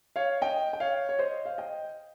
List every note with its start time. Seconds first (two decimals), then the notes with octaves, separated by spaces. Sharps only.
0.16 C#5 F5
0.42 D#5 G5
0.73 G5
0.80 C#5 F5
1.09 C#5
1.19 C5 D#5
1.46 F5
1.58 D#5 G5